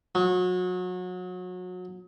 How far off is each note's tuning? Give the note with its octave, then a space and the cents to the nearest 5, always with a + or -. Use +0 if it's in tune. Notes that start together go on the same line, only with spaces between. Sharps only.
F#3 -30